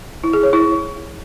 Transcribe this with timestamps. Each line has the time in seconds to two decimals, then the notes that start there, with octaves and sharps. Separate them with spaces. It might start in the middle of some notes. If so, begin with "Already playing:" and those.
0.24 E4
0.33 G#4
0.43 C#5
0.53 E4